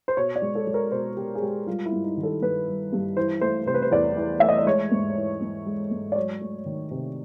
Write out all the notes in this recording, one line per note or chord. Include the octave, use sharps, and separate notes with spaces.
C5
B2 C#5
D5
G#3
A4
G#3
A#4
B2 C5
B2 G4
G#4
G#3 G4
G3 F4
E4
G2
D#4
D#3
A4
G2 B4
G3
G2
E3 C5
A3 C5
C3 C5
B4
C5
E2 D5
E3
A3 E5
D#5
D5
G#3 C#5
G#2
E3
G#2
G#3
G#2
D5
F#3 C#5
A3
D#3
C3